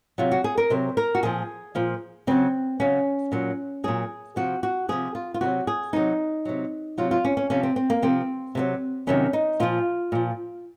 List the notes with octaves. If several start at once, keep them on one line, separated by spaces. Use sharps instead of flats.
C3 F#3 F4
F#4
G#4
A#4
C3 F#3 C5
A#4
F#4
A#2 F3 G#4
A#2 F3
C#3 F#3 C4
C#3 F#3 C#4
A#2 F#3
A#2 F#3 G#4
C3 F3 F#4
F#4
C3 F3 G#4
F4
F4
C3 D#3 F#3 F#4
G#4
C3 D#3 F#3 D#4
C3 F#3
C3 F#3 F4
F4
C#4
C#4
C3 F3 C#4
C4
C4
A#3
C3 F3 C4
C3 D#3 F#3
C3 D#3 F#3 C#4
D#4
A#2 F3 F4
A#2 F3